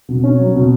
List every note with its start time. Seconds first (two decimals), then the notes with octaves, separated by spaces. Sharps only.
0.09 B2
0.24 C#4
0.39 F#3
0.55 B2